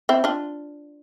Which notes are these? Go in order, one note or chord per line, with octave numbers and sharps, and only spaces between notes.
C4 E4
D4 F4